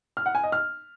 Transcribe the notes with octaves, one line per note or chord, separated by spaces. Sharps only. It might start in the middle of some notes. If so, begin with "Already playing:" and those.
F6
F#5
G#5
D#5
F6